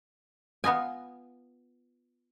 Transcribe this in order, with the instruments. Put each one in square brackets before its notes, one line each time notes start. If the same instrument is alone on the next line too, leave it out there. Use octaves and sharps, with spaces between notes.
[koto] B3 F4 D#5 G#5